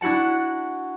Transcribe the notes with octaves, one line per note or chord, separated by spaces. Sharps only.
D4 E4 F#4 F#5 A5